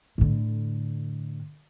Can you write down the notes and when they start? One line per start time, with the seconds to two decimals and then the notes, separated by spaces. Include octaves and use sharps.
0.18 A2 D3